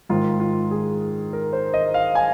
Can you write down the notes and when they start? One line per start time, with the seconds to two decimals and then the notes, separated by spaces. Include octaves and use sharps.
0.09 G#2 D#3 F4
0.40 F4
0.71 G#4
1.33 A#4
1.53 C5
1.74 D#5
1.94 F5
2.15 G#5